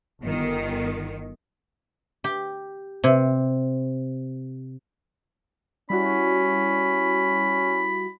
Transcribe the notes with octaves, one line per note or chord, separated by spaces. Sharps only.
G1 D#3
G4
C3
G3 C#4 E4 F#4 B5